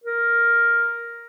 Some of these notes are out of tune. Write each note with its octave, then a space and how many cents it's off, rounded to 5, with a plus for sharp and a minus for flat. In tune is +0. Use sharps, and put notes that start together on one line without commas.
A#4 +5